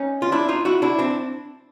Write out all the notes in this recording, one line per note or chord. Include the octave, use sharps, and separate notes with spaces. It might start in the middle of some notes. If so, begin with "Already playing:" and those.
Already playing: C#4 D#4
F4
D4 E4
D#4 F4
E4 F#4
D4 E4
C4 D4